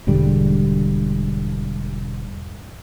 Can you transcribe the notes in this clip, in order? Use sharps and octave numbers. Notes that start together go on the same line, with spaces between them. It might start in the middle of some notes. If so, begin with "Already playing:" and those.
E1 G#2 D3 G3